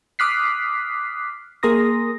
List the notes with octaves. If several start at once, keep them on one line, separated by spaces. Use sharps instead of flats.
D6 D#6 F6 F#6 B6 C7
A#3 G#4 A#4 C6 D#6 A#6